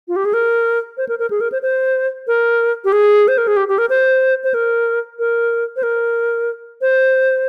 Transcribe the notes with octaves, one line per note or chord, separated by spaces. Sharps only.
F4
G4
G#4
A#4
C5
A#4
A#4
G#4
A#4
C5
C5
A#4
G4
G#4
C5
A#4
G#4
G4
G4
A#4
C5
C5
A#4
A#4
C5
A#4
C5